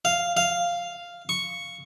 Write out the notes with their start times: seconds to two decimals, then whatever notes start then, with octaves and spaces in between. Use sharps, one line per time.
0.05 F5
0.37 F5
1.29 C#6